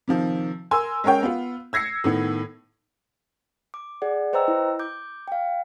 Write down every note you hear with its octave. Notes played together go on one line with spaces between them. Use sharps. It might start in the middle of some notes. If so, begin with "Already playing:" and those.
C3 D#3 F3
A#4 G#5 C6 E6
G#3 C#4 A#4 C#5 G5
B3 F4
E6 G#6 A#6 C7 C#7
A2 D#3 B3
D6
G#4 D5 F#5
B4 C5 D#5 G5 A#5 E6
E4
D6 G6
F5 G5